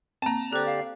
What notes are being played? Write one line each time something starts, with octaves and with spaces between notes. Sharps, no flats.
A#3 C4 A5 A#5
D3 G4 A4 C5 D5 F#6
F5